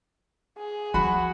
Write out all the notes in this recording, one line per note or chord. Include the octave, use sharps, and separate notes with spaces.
G#4
F3 F#4 B5